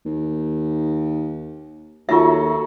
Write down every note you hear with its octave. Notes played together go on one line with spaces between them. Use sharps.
D#2
D#2 F#3 A3 F4 E5 C#6